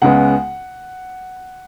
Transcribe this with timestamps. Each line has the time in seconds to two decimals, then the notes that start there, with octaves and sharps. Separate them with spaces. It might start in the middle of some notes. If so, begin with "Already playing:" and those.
0.02 C#2 C#3 G#3 B3 F#5